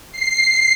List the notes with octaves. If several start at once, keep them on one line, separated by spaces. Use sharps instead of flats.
C7